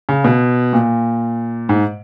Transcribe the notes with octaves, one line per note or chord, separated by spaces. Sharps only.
C#3
B2
A#2
G#2